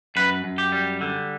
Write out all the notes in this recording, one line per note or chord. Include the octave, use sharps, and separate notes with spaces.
F#2 B4
F#2
G4
G3
D3